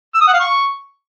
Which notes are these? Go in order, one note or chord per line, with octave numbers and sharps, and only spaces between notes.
E6
D#6
F#5
F5
C#6